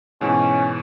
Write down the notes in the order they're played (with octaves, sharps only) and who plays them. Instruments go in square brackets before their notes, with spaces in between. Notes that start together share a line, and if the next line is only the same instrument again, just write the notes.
[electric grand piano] G#2 B2 E3 [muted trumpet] C#4